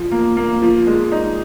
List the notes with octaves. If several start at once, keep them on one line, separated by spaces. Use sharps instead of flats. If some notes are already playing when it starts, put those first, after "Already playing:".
Already playing: F3
A#3
A#3
F3
G#3
D#4